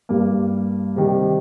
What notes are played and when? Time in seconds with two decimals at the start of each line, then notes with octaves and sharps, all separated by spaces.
0.09 G2 G3 A#3
0.96 C3 D#3 G3